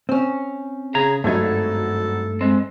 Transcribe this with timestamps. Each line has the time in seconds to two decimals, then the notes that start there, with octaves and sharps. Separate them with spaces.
0.09 C4 C#4
0.95 C#3 G#4 A#5 G#6
1.24 G#1 G2 F#3 A3 D#4 A4 G#6
2.41 G#3 C4